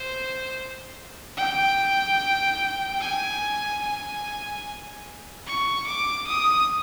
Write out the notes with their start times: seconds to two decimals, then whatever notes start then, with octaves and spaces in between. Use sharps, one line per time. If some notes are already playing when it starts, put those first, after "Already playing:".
Already playing: C5
1.37 G5
3.00 G#5
3.82 G#5
5.46 C#6
5.87 D6
6.27 D#6